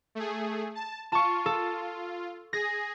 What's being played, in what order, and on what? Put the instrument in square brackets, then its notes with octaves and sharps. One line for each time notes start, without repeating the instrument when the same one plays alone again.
[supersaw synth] A3 G#4
A5
[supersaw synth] F4 [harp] A5 C#6
[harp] A4
[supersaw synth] G#4 [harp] A#6